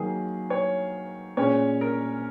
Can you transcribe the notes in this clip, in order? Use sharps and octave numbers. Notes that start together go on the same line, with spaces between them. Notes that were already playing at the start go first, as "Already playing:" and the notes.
Already playing: D#3 F#3 A#3 G#4
C#5
A#2 G#3 C#4 C#5
A#4